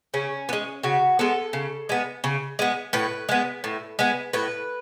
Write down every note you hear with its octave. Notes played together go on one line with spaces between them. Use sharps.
C#3 C#4
B3
G#3
C#3 F#4
G#3 B3 A4
C#3
G#3 B3
C#3
G#3 B3
A2 B4
G#3 B3
A2
G#3 B3
A2 B4